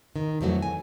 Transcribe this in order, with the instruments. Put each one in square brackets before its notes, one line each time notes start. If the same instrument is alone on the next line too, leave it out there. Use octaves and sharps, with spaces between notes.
[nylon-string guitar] D#3
F2 E3 F#3 A3 F#4
G#5